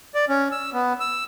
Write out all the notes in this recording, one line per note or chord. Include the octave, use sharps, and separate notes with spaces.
D5
C#4
E6
B3
E6